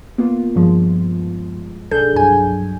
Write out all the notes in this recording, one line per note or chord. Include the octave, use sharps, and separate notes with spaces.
A#3 B3 F4
G2 F3 G#3
B1 D4 G#4 A4 G6
C2 G2 F#3 G#5